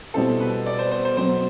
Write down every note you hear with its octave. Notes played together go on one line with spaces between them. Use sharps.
B2 G3 C4 E4 A4
B4
D5
C5
C5
C5
B2 F#3 C4 C5